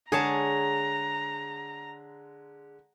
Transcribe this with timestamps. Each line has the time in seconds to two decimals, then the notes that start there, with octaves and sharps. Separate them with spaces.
0.12 D3 G#3 G#4 C#5 A5 A#5